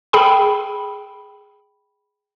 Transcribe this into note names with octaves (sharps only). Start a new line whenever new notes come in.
G#4 G5 B5